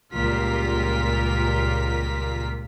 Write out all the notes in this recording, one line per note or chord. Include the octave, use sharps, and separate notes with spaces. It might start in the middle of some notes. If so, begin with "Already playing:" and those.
C#2 A#2 G3 F4 A#4 B6